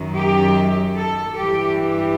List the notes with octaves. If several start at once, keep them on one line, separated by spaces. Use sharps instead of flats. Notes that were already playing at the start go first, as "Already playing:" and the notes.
Already playing: F#2 D#3 F#3
G4
A4
G2 E3 G3 G4
G4